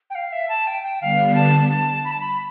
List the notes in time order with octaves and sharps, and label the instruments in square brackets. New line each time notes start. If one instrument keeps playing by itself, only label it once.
[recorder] G5
F5
E5
A5
G5
G5
[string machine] D3 G3 B3 D4 [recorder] F5
[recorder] A5
A5
B5
A5
B5